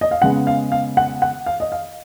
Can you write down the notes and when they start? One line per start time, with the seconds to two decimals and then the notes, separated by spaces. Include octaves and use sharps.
0.01 D#5
0.11 F5
0.22 C#3 G#3 B3 F#5
0.47 F5
0.72 F5
0.97 F#5
1.22 F#5
1.46 F5
1.60 D#5
1.72 F5